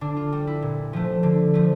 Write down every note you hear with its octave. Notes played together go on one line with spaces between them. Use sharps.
D3 D4
F4
G3
E4
A#2
F3 A3
D3
F3 A3